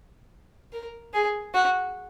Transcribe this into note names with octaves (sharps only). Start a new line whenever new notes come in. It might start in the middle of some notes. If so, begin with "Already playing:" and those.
A#4
G#4
F#4